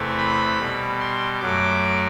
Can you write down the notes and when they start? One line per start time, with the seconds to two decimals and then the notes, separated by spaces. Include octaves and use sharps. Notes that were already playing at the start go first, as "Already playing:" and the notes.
Already playing: E2 C3 E3 A3
0.18 B5
0.59 B2 G3
0.99 C6
1.40 F#2 F#3 A3 D6